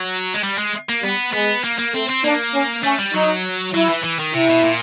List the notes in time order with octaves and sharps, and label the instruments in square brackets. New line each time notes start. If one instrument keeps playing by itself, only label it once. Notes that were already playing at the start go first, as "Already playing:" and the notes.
Already playing: [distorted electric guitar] F#3
G#3
G3
G#3
A#3
[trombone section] G3 [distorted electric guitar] B3
[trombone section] G#3 [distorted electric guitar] B3
[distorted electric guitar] A#3
A#3
[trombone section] A3 [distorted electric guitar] C4
[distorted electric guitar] C4
[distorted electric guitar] A#3 [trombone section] D4
[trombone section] C#4
[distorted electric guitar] A3 [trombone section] C#4
[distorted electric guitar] G3
[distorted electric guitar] F#3 [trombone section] D#4
[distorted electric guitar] F#3 [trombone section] E4
[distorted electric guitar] E3
E3
D#3
[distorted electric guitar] C3 [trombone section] E4
[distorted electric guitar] B2
A#2